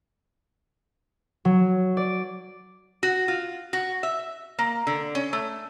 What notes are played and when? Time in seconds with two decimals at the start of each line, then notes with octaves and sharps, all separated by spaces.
1.45 F#3
1.97 D5
3.03 F#4
3.28 F4
3.73 F#4
4.03 E5
4.59 A#3
4.87 D3
5.15 C#4
5.33 A3